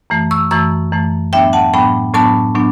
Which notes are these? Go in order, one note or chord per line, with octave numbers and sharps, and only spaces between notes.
F#2 E3 A3
C#6 E6
F#2 E3 A3 C#6 E6
F#2 E3 A3
A2 F#3 B3 D4 E5 G5
F#5 A5
A2 F#3 B3 D4 G5 B5
A2 F#3 B3 D4 A5 C#6
A2 F#3 B3 D4